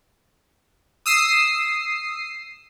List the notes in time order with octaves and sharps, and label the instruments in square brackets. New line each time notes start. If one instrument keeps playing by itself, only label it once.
[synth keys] D#6 E6 C7